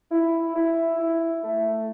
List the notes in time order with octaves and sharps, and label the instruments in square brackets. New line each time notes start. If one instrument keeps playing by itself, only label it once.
[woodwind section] E4
E4
E4
A3